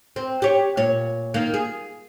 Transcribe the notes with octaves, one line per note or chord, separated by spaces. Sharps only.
C4
G4 C#5
A#2 C#5
D#3 A#3
G#4